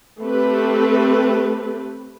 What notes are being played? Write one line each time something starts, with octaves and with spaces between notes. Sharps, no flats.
A3 C4 G4 A4 B4